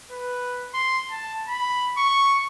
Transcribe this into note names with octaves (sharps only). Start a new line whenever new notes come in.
B4
C6
A5
B5
C#6